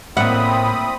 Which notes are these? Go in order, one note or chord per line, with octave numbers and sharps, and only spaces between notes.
A2 A#3 C4 D5 E5 F#5 B5 D#6